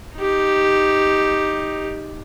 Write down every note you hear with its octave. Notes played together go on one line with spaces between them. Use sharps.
D#4 G4